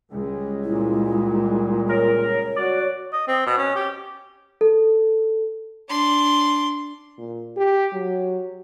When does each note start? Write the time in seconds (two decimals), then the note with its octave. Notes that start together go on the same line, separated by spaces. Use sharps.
0.10 C#2 G3 G#3
0.64 A#2 E4
1.89 A#4 C#5
2.56 F#4 D5
3.13 D#5
3.28 C4
3.46 B2
3.58 C#4
3.76 G4
4.61 A4
5.89 D4 C6
7.18 A#2
7.57 G4
7.94 F#3